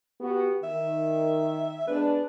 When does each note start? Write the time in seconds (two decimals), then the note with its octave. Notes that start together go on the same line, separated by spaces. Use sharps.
0.21 B3 F#4 G4
0.64 D#3 E5
1.87 G#3 B3 D4 B4